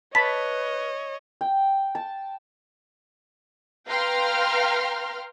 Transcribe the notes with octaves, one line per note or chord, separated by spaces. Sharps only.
B4 C#5 D#5 A5 B5 B6
G5
A5
B4 F5 G5 A#5 C6 F6